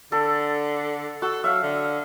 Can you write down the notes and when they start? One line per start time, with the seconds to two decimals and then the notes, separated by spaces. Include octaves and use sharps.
0.12 D3 A4
1.22 F#4 A4
1.44 F#3 E5 F5
1.63 D3